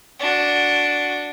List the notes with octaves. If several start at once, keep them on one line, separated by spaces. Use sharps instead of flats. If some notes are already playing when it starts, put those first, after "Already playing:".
D4 F#4